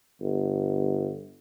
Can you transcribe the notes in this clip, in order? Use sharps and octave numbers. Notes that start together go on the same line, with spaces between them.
G1